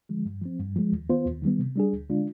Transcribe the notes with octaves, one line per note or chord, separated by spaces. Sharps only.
D3 F3 G#3
G2
F3 C4
G2
F3 G#3
D#2
D#3 B3 F4 C5
D#2
D#3 G3 B3
C3
G3 D4 G#4
D2
D3 G#3 D4 F4